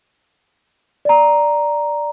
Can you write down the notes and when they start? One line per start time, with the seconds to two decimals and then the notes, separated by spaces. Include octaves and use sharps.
1.05 D5 A#5